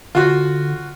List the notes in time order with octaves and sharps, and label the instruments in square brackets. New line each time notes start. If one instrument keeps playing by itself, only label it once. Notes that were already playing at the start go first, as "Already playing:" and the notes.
[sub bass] D3 [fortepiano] F4 F#4